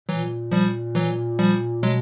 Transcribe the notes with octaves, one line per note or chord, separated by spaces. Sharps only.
A#2 E3 F#3
F3 G3
E3 F#3
F3 G3
B2 F#3 G#3